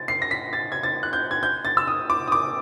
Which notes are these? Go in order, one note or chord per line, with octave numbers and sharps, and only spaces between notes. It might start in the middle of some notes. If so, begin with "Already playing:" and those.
Already playing: A6
C7
A#6
B6
A6
G#6
A6
F#6
G6
G#6
G6
A6
E6
D#6
D6
D#6
D6